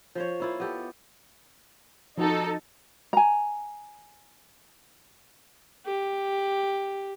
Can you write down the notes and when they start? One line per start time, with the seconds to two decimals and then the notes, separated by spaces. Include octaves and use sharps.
0.15 F3 C5 C#5
0.40 A#3 E4 F4
0.60 B3 G4 A4
2.18 F3 D#4 F#4 A4
3.13 G#5 A#5
5.86 G4